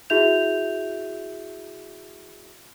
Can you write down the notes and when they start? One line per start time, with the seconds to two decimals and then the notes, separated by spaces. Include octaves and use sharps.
0.10 E4 F#4 G#4 E5 G6 F7